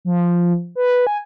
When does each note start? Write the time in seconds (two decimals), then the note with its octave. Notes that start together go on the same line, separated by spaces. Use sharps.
0.05 F3
0.76 B4
1.07 G#5